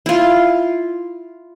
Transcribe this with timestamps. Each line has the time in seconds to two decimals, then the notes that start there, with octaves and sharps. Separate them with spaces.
0.06 E4 F4